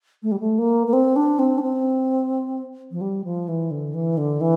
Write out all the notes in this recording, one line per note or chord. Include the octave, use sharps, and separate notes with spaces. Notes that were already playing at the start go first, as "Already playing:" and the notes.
A3
G3
A3
A#3
A#3
C4
D4
C4
D4
C4
F3
G3
F3
E3
D3
E3
D3
E3